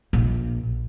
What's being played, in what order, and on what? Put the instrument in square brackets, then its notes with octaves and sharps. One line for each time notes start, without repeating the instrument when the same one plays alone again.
[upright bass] A#1